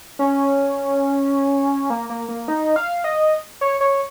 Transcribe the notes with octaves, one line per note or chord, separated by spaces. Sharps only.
C#4
A#3
A#3
A#3
D#4
F5
D#5
C#5
C#5